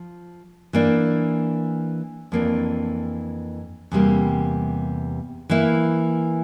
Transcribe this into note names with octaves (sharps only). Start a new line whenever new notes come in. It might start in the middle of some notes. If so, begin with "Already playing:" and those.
Already playing: F3
E3 A#3 D4
F2 E3 A#3 D4
E2 C3 G3 A#3
E3 A#3 E4